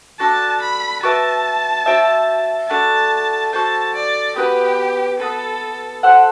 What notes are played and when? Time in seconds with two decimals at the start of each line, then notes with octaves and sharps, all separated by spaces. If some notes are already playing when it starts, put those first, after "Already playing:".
0.19 D4 F#4 A4 A5
0.61 B5
1.03 F#4 B4 E5 G5 A5
1.86 F#4 C5 E5 G5
2.69 A3 D4 F#4 A5
3.53 F#4 A4 C5 A5
3.95 D5
4.36 B3 F#4 G4 B4
5.19 B3 F#4 A4 B4
6.03 F#4 A4 C5 F#5